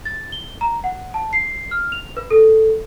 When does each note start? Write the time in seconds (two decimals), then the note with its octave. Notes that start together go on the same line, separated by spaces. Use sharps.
0.05 A6
0.32 G7
0.61 A#5
0.84 F#5
1.14 A5
1.33 C7
1.71 F6
1.92 F7
2.17 B4
2.31 A4